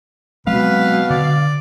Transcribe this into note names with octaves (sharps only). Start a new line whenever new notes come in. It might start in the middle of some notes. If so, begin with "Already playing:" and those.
B2 F#3 G#3 C4 B4 F5
D3 D5